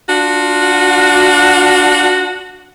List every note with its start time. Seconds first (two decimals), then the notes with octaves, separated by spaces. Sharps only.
0.08 D4 F4 F#4